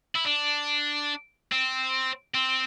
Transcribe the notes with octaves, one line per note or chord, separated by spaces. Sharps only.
E4
D4
C4
C4